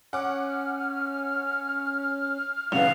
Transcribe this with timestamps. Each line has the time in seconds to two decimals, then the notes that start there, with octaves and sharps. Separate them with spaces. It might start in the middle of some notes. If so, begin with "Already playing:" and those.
0.13 C#4 F#5 D6 F6
2.72 B1 C#3 E3 F5 F#5 F7